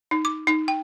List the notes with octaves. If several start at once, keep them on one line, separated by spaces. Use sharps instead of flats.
D#4
D6
D#4
G5